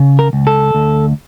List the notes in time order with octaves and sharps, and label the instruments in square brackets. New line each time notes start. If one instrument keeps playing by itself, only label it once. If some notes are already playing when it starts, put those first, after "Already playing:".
Already playing: [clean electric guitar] C#3
A#4
C#2
A4
D2